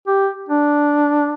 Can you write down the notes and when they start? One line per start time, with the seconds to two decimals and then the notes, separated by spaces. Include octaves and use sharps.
0.07 G4
0.49 D4